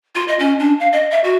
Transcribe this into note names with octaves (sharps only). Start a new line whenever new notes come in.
F4
D#5
C#4
D4
F5
D#5
E5
F#4